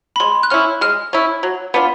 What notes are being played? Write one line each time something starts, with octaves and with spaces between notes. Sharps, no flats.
B5
G#3 C6
F#6
C#4 E4 F6
G#3 F6
C#4 E4
F#3
B3 D4 F4